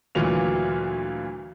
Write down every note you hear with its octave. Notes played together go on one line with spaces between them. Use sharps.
D2 A#2 E3 F#3 F4 F7